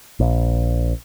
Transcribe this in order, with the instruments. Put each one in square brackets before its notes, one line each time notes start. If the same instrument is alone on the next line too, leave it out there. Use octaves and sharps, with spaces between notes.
[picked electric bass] A#1